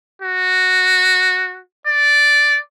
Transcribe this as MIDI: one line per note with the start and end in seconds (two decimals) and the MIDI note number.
0.22 1.61 66
1.87 2.59 74